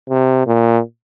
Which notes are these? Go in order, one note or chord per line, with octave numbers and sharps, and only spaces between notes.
C3
A#2